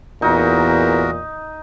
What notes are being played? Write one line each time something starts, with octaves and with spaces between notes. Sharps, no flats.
E2 A#2 D#4 F#4 A#4